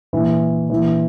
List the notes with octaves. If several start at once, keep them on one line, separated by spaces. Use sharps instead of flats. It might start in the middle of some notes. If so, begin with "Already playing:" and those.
A#2 E3
A#2 E3